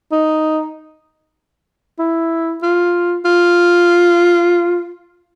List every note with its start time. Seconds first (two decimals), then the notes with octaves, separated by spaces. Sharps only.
0.12 D#4
1.99 E4
2.62 F4
3.25 F4